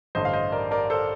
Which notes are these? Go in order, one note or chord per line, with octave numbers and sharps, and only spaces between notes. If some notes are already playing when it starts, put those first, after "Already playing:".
A1 G2 D3 C5 D#5
F5
C5 D#5
A#4 D5
A#4 D5
A4 C5